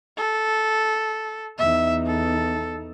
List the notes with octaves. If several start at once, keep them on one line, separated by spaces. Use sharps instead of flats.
A4
E2 D#4 E5
A4